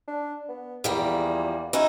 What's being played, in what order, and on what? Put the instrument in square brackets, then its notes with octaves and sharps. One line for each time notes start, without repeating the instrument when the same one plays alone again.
[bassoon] D4
B3
[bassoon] E2 [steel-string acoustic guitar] F3 G3 A#3
[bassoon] C#4 [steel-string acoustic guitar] D#4 E4 F#4